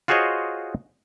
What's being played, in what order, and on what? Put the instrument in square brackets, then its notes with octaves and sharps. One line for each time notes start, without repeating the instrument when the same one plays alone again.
[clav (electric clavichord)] F4 F#4 G#4 C5 C#5 D#5